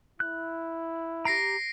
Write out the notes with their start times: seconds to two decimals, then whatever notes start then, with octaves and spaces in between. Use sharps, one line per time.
0.20 E4 F#6
1.25 G4 A#5 A#6 C7 D7